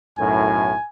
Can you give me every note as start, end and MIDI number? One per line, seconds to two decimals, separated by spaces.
0.18 0.73 35
0.18 0.73 42
0.18 0.73 45
0.18 0.88 80